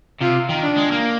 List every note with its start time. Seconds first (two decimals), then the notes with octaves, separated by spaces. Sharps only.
0.21 C3 F4
0.50 D#3
0.63 D4
0.78 G#3
0.92 A#3